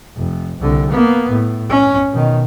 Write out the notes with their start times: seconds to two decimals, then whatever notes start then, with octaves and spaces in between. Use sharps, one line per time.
0.17 F1
0.60 C2 D3
0.90 A#3 B3
1.31 A2
1.70 C#4
2.12 B2 D#3